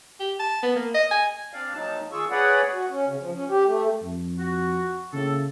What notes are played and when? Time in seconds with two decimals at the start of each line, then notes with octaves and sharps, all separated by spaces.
0.20 G4
0.40 A5
0.63 B3
0.76 A#3
0.95 D#5
1.11 G#5
1.53 C4 D4 D5 F5
1.74 A#2 F3 F#3 D#4 A5
2.12 D#3 F4 G#4 C#6 E6
2.31 G#4 B4 C#5 D5 F#5
2.72 F#4
2.90 C#4
3.07 C#3
3.21 F3
3.34 C#4
3.50 G4
3.67 A3
4.02 F2
4.39 F#4
5.14 A2 C#3 A#3 A4